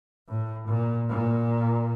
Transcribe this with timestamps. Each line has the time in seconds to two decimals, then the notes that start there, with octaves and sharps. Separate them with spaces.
0.28 A2
0.68 A#2
1.09 A#2